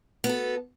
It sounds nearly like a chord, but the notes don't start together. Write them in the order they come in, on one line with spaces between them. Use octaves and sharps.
B3 F#4 A4